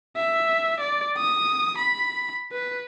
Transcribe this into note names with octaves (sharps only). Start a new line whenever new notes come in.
E5
D5
D#6
B5
B4